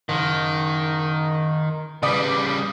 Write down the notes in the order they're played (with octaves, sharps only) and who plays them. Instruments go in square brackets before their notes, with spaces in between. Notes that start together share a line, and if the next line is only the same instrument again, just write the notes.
[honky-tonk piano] F#1 [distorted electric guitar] D#3
[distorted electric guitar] C#3 G3 [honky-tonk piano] B4 D5 D#6